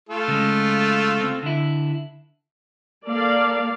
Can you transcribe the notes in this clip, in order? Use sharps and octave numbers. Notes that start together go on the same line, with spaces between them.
A3 F4 A4
C#3 G#3
C4
D3 E4
A#3 A4 D5 F5